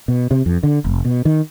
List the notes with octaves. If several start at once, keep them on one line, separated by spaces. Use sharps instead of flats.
B2
C3
F2
D3
F1
B2
D#3